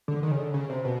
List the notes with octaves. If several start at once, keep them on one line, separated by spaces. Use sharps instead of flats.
D3
D#3
C#3
D3
C#3
C3
B2